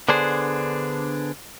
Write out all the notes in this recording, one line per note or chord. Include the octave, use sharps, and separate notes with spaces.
D3 B3 D4 G#4 C5